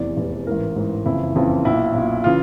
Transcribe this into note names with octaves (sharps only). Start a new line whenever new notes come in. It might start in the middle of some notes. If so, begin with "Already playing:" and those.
Already playing: F1 E2 C3 E3 D5
F1 E2 C3 E3
A1 G#2 E3 A#4
A1 G#2 E3
F#1 F2 C#3 E3 E4
F#1 F2 C#3 E3
B1 A#2 E4
B1 A#2
C#3 E3 F4